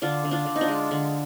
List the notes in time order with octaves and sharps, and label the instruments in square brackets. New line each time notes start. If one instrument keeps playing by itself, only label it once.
[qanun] D3 D4 F4
D3
D4 F4
D3
D#4
D4 F4
G#3
D3